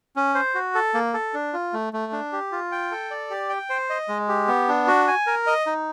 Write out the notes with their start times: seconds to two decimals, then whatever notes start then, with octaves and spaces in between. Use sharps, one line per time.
0.16 C#4
0.35 C5
0.55 F#4
0.75 A4
0.94 A#3
1.14 A4
1.34 D4
1.53 F4
1.73 A3
1.93 A3
2.12 D4
2.33 G4
2.52 F4
2.72 G5
2.92 A4
3.11 D5
3.30 G4
3.49 G5
3.70 C5
3.90 D#5
4.08 G#3
4.29 G4
4.48 B3
4.68 D4
4.87 F#4
5.08 G#5
5.27 A#4
5.47 D#5
5.66 D#4